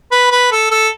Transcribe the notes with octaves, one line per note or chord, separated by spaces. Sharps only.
B4
B4
A4
A4